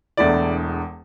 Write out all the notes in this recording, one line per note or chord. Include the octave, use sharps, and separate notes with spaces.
E1 E2 D3 A3 E4 D5